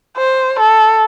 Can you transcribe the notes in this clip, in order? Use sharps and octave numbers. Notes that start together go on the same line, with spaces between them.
C5
A4